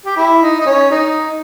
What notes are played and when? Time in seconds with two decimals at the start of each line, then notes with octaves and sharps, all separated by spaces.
0.06 G4
0.17 E4
0.42 D#4
0.61 D#4
0.66 C#4
0.91 D#4